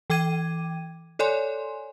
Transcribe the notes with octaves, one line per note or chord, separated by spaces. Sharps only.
E3 G5 D6 G#6 D#7
A4 C#5 D5 G#5 C6